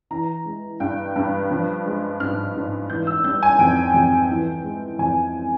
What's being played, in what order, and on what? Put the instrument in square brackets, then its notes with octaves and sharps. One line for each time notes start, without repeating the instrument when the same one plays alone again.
[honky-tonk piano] E3 A#5
G#3
G2 G5
G2
F3
G#3
G#2 F6
G#2
E3 G6
E6
G3 G6
G#5
F2 G5
F2
E3
G#3
F2 G#5